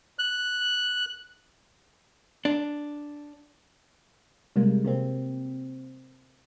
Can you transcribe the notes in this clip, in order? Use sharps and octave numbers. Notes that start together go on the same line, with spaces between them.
F#6
D4
C3 G3 G#3 A#3
C3 A#3 C4